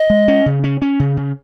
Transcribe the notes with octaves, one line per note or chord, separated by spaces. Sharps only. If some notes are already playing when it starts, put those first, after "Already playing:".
Already playing: D#5
G#3
C#4
C#3
C#4
C#4
C#3
C#3